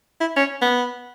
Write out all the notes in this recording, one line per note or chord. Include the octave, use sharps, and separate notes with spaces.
E4
C#4
B3